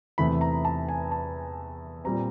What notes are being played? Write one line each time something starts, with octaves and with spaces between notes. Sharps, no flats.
E2 C3 E3 A3 B5
A#5
A5
G#5
A5
A#2 G3 C4 A#5